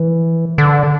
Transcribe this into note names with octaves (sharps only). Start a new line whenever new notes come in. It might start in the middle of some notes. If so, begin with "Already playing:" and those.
Already playing: E3
D3